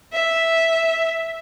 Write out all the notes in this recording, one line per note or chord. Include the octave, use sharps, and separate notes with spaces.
E5